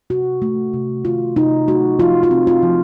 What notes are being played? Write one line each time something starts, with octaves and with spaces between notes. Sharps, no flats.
C3 F#4
A3
C3
D#3 F4
C3 D#4
A3 F#4
F3 F4
F4
C4
F4
F3